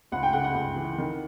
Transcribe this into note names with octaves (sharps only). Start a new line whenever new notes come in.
C#2 F#5
G5
C#3 F#5
F#5
C#2
E3
D#3